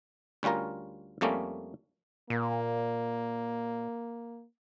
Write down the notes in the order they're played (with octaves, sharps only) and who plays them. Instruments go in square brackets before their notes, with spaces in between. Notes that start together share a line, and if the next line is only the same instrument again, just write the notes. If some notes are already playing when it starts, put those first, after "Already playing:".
[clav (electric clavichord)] D2 G3 C#4 F4 A#4
F2 G3 A3 A#3 C#4
[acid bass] A#2 [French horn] A#3